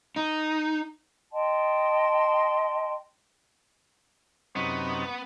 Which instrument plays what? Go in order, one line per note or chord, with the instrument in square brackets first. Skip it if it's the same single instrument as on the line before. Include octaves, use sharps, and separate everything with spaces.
[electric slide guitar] D#4
[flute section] D#5 G5 A5 C6
[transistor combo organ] F#2 C3 D#4 [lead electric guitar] B3 [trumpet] C#6